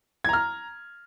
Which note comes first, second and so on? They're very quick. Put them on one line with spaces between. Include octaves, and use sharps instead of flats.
G#6 A#5 F6